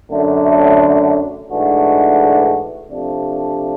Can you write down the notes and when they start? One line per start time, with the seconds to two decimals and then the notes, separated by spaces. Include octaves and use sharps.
0.10 F#2 D3 F#3 A3 D4
1.50 G#2 E3 A3 D4 F#4
2.90 C3 F3 A3 D4